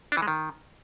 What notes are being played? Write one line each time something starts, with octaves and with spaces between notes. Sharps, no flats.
D4
E3
G#3
D#3